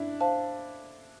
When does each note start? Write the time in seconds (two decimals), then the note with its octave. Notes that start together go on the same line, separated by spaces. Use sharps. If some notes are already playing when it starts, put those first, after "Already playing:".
Already playing: D4 E4
0.21 C5 F5 A5